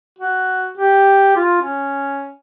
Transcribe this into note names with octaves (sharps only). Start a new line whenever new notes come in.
F#4
G4
F4
C#4